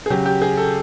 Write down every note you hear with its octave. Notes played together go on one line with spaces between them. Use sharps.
G#4
C#3 F#3 G4
G4
G#4
A4